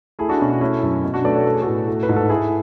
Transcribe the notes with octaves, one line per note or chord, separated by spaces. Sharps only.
A3 E4 G#4
D4 F#4
B2 C#4 E4
D4
A3 C#4 E4
F#2
B2
D4 F#4
A3 B4 D5
A4 C#5
B3 A4
G#4
A2 F#4 A4
A3
B4
G#2
A4
A3 E4 G#4